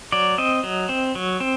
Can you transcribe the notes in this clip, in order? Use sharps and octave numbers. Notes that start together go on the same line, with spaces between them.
F#3 D5
C4 D#5
F#3
C4
F#3
C4